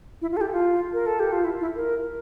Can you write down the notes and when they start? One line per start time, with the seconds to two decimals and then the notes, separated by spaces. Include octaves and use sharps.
0.22 E4
0.32 F4
0.37 A4
0.41 G4
0.52 F4
0.93 A#4
1.06 A4
1.20 G4
1.32 F4
1.45 E4
1.60 E4
1.76 A#4